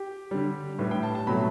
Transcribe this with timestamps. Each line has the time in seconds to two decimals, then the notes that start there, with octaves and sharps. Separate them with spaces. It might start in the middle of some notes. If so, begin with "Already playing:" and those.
Already playing: G4
0.31 D3 G3
0.79 A2 G3 B4
0.91 G5
1.03 A5
1.15 A5
1.27 B2 F#3 A3 B5